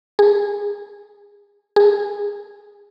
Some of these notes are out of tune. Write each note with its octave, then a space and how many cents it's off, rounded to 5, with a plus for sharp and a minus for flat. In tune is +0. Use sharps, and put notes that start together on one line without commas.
G#4 -25
G#4 -20